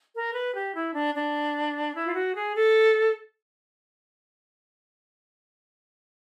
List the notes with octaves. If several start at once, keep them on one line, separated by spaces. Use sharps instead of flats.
A#4
B4
G4
E4
D4
D4
E4
F4
F#4
G#4
A4